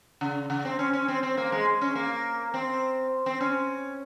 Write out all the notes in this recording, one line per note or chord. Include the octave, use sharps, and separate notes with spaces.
C#3
C#3
C4
C#4
C#4
C4
C4
A#3
G#3
C#4
A#3
C4
C4
C#4